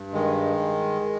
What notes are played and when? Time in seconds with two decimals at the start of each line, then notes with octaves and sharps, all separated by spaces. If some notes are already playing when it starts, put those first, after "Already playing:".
Already playing: G2
0.13 D#3 G#3